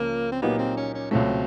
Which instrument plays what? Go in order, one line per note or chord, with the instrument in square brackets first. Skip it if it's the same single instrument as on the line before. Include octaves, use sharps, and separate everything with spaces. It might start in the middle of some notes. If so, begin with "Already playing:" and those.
Already playing: [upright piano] C#2 C#3 F3 [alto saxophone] A#3
[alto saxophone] C4
[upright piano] A#2 F#3 A#3 D#4 G4 [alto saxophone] B3
[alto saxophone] C4
C#4
C#4
[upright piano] C#2 B2 F#3 A3 [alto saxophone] C4